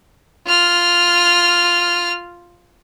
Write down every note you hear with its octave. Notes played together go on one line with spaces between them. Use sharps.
F4 F6